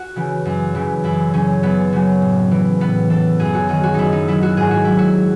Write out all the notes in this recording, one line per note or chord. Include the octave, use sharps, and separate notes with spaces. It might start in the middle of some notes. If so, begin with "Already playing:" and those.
Already playing: F#4
C#3 E3
F#2
C#3 E3
F#2 E4
C#3 F#3 C#4
F#2 B3
C#3 F#3
A2
E3
A2 B3
E3 A4
F#2 G#4
F#4
D#3 F#3 G#4
F#4
F#2 D#4 E4
D#4
D#3 F#3 E4
F#4
G#2 G#4
F#4
F#3 E4
F#4